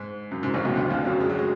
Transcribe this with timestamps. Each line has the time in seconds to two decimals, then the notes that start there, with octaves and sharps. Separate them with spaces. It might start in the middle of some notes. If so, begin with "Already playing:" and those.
Already playing: G#2
0.31 F#2
0.43 G#2
0.54 A1 A2
0.65 B1 B2
0.76 D2 D3
0.87 D3
0.90 F2 F3
1.05 F#2 F#3
1.20 G#3
1.30 F#3
1.39 G#3